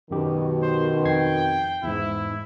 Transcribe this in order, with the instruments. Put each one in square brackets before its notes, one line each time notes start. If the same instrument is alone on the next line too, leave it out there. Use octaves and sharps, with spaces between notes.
[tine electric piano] F#2 G4 [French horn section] B2 D#3
[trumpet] C5
[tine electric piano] F2 G#6 C7 [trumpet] G5
[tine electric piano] E2 G#2 [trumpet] E4